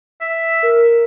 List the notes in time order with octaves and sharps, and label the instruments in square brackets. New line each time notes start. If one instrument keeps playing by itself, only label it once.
[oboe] E5
[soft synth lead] A#4